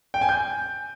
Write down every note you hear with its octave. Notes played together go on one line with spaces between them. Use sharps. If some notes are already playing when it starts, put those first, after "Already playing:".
G5
G#5
G6